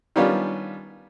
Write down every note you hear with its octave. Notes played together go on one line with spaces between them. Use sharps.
D#3 G3 B3 C#4 D4 F4